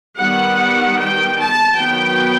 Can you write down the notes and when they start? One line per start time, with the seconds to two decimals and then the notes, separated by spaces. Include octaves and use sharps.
0.19 D#3 G3 B3 F#5
0.98 G5
1.38 A5
1.77 D#3 F#3 B3 G5